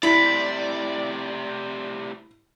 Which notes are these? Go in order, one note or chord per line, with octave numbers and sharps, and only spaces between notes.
A2 C3 E4 D5 B5